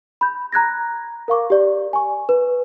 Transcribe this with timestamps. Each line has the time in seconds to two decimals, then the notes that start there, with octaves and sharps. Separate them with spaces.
0.21 B5 G6
0.52 A#5 F#6 G#6 A#6
1.28 A#4 F5 C#6 D6
1.50 G4 D5
1.93 G#5 C#6
2.29 B4